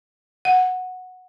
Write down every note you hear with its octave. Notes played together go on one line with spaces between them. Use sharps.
F#5